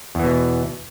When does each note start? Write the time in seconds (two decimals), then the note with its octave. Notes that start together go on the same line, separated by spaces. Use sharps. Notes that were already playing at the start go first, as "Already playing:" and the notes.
0.15 E2
0.19 E3
0.24 B2